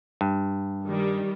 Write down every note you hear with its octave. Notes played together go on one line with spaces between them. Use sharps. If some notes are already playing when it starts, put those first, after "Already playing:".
G2
D#3 G3